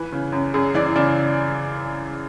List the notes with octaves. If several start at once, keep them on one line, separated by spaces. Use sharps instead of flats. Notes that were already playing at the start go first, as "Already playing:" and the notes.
Already playing: E3 B4
C#3
F#2
F#2 G#4
E3 D5
C#3 D5